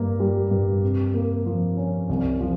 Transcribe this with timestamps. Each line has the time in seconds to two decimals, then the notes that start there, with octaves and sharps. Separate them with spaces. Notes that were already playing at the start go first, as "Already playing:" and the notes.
Already playing: G2 A#3
0.20 G3
0.51 G2
0.83 C3
1.14 A#3
1.46 F3
1.77 C#4
2.09 C2
2.41 F3